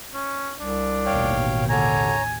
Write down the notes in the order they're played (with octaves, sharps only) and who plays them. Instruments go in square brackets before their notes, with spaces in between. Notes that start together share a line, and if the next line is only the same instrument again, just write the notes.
[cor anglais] C#4
[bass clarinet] C2 [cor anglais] D4
[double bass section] A1 D#2 B2 [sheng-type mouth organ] C#5 F5 G5
[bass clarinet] D3 [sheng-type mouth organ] C#5 A#5 [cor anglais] G#5